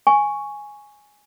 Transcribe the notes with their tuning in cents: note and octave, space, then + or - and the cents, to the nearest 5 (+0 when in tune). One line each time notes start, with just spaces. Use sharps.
G#5 +0 C#6 +0